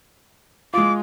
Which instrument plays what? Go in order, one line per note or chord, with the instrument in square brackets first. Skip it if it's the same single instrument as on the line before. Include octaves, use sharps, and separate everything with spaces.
[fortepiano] G#3 F4 [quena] D6